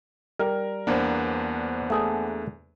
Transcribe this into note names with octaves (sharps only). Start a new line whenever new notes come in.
G3 A#4
E2 A#3 B3 D4 C5
A3 G#4 A4